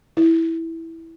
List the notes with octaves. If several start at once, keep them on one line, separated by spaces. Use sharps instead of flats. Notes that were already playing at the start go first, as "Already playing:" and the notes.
E4